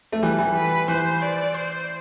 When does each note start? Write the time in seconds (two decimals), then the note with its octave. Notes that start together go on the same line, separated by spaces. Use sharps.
0.12 A3
0.22 E3 G3 A4
0.38 E3 G3
0.55 B4
0.88 E3 C5
1.22 D5
1.54 C5